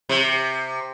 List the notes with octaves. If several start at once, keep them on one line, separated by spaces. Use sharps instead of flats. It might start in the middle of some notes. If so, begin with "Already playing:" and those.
C3